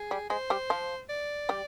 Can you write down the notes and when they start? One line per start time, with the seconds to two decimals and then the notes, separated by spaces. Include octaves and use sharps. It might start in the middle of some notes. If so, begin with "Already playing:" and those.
Already playing: G#4
0.11 G3
0.30 G#3 C5
0.50 G3 G4
0.70 F3 F4
1.09 D5
1.49 G3 G4